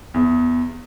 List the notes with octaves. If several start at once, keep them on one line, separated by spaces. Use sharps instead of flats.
E2